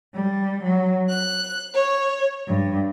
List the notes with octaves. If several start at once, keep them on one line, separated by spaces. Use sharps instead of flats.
G3
F#3
F#6
C#5
G2